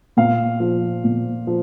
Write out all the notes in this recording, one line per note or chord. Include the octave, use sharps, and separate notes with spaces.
A#2 F5
F3
A#2
F3